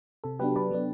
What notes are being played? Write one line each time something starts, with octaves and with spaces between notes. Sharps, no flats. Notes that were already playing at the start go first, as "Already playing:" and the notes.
C3 A4
F#3 B3 D4 G4 B4
C3 B4 D5
F#3 B3 D4